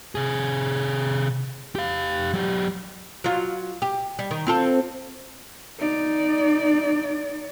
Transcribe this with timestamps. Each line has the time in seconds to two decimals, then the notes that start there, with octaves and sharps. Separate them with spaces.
0.15 C3 G#4
1.75 G4 F5
2.33 F#3 G4
3.24 F#3 F4
3.82 G4
4.19 G3
4.31 D#3
4.47 C4 F4 A4
5.79 D#4 D5